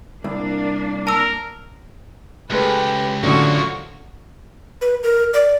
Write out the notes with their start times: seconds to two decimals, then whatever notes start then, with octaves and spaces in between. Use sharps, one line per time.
0.24 C2 A#3 D4
1.07 A#4 A5 E6
2.50 C#2 G#3 A3 G4 B4 F#6
3.23 F#2 A2 D3 F3 A#3 F#4 C#6
4.81 B4
5.03 A#4
5.34 D5